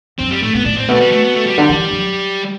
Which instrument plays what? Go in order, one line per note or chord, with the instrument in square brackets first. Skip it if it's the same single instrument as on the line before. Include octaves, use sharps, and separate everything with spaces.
[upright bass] F#2 [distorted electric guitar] C4
[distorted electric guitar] G3
[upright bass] A2 [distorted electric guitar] A3
[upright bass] A2 [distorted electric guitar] B3
[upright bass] A2 [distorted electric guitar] D4
[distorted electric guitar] C4
[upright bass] B2 [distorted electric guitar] A3
[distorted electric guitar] G3
A3
B3
A3
G3
[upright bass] D3
E3
F#3